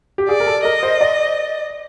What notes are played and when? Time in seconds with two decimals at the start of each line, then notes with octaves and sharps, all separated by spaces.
0.18 G4
0.28 G#4 D5
0.40 A#4
0.46 A4
0.65 A#4 D#5
0.83 C5
1.01 D5